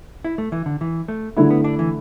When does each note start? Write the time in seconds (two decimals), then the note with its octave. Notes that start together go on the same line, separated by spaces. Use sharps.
0.25 E4
0.38 A3
0.52 E3
0.66 D3
0.81 E3
1.08 A3
1.37 D3 F#3 A3 E4
1.50 B3
1.64 D4
1.79 E3